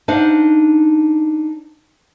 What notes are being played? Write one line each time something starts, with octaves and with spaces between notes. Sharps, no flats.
D4 D#4 C5 F5 F#5